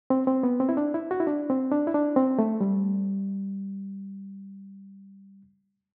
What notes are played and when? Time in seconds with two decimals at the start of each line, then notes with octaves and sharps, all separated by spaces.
0.10 C4
0.27 C4
0.43 B3
0.60 C4
0.69 E4
0.77 D4
0.94 E4
1.11 F#4
1.20 E4
1.27 D4
1.50 C4
1.72 D4
1.87 E4
1.94 D4
2.16 C4
2.39 A3
2.61 G3